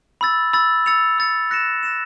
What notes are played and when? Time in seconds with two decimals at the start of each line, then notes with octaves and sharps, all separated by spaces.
0.21 B5 E6 A6
0.53 B5 E6 A6
0.86 E6 A6 C#7 F7
1.18 E6 A6 C#7 F7
1.51 F#6 A#6 C#7 E7
1.83 F#6 A#6 C#7 E7